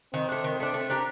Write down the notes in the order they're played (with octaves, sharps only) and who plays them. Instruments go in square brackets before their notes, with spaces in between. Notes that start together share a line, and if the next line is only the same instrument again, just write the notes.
[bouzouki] D#3 [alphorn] C4
[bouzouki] A3 D4
D#3
A3 D4
[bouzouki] A3 [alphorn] C4
[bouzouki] D4 G4 A#4